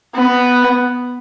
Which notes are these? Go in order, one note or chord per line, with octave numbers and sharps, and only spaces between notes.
B3